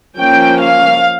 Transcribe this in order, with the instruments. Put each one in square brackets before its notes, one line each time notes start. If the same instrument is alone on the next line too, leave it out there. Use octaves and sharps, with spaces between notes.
[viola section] F3 A#3 C#4 G5
F5